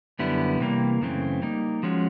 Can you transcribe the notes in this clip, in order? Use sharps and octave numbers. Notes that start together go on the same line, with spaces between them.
F#2 D3 G3 B3 E4
C3 E3 G3 A#3
F#2 C#3 E3 A3 C4
G3 A#3 D#4
F3 G#3 C#4 F#4